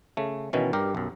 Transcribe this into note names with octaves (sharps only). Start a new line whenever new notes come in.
C#3 A3
B2 D#3 E3 C#4
G2 G4 A#4
B1 F#2